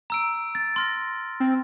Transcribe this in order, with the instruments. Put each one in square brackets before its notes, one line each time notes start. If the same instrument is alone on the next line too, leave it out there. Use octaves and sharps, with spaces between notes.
[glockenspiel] A#5 E6 D7
A6
C6 F6 A#6
[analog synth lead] C4